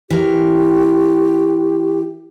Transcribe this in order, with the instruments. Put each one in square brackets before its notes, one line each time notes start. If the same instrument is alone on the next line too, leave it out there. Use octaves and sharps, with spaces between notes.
[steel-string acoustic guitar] E3 A#4 [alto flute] G4